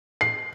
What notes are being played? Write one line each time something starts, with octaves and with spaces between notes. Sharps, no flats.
C7